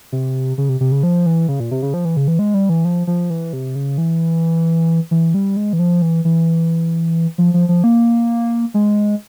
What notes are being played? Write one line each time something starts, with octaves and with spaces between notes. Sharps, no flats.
C3
C#3
C3
C3
C#3
F3
E3
C#3
A#2
C3
C#3
F3
E3
C#3
E3
G#3
G3
E3
F3
F3
E3
C3
C#3
E3
E3
G3
G#3
E3
F3
E3
E3
F3
F3
F3
A#3
G#3